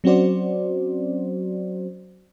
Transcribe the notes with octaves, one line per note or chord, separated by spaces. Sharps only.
F#3 C4 C#4 F#4 C5 D5